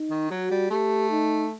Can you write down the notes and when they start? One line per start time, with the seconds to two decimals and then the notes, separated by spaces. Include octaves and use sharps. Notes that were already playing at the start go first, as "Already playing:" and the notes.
Already playing: D#4
0.10 D#3
0.31 F#3 F#4
0.51 G3
0.70 A3 G4
1.11 D#4